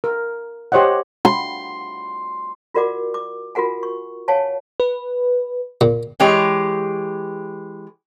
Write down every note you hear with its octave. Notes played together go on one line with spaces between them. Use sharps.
A#4
G4 C5 C#5 D#5 F#5
C6
F4 F#4 A#4 D5 F#5 D6
D6
F4 F#4 A#4 F#5 G#5
C#6
C#5 F5 F#5 G#5 A5
B4
A#2
E3 G#3 G4 G#4 C#5